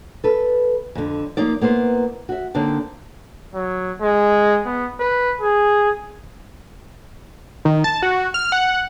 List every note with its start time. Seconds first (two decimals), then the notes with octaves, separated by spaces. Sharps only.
0.24 A4 B4
0.95 F2 D3
1.37 F3 A#3 D#4 D5
1.61 A#3 B3 E4 C5
2.29 F#4 E5
2.54 D3 A#3 C4 D4 D#4
3.55 F#3
4.02 G#3
4.66 B3
5.00 B4
5.41 G#4
7.65 D#3
7.84 A5
8.02 F#4
8.34 F6
8.52 F#5